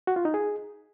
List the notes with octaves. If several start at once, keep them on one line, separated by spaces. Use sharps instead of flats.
F#4
F4
D#4
G#4